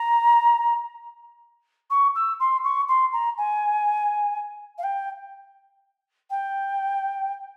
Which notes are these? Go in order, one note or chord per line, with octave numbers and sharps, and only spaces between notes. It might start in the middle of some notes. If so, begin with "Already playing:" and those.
Already playing: A#5
C#6
E6
C6
C#6
C6
A#5
G#5
F5
G5
G5